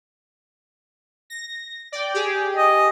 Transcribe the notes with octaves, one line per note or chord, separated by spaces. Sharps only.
A#6
D5 G5
G4 G#4
D#5